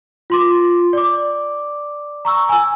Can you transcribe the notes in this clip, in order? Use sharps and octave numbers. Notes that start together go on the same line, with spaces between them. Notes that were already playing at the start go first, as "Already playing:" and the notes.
F4 C6 D6
D5 D6
A#5 C#6 E6
G#5 E6